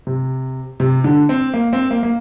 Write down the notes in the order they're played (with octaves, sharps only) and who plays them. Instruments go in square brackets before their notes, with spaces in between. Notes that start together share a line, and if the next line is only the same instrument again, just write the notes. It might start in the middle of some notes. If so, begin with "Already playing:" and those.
[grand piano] C3
C3
D3
C4
A#3
C4
A#3
A#3